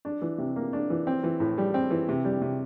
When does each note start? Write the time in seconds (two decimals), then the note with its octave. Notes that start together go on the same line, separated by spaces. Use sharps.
0.05 D4
0.22 E3
0.38 C3
0.56 A#3
0.73 D4
0.90 E3
1.07 C4
1.23 E3
1.40 A2
1.58 G3
1.74 C4
1.90 E3
2.09 C3
2.25 G3
2.41 C3